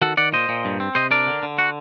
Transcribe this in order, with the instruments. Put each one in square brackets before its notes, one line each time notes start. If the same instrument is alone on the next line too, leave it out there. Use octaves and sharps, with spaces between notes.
[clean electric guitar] D#3 F#4 A4
D#3 D5 F#5
A#2 C5 D#5
A#2
G2
C4
C3 C5 D#5
D4 A#4 D5
D3
D3
F#4